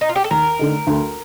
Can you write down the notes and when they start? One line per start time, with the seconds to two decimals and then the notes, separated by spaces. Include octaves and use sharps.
0.01 D#4
0.09 F4
0.16 G4
0.24 A4
0.31 D#2 A#4
0.59 D3 A3 D#4
0.87 D2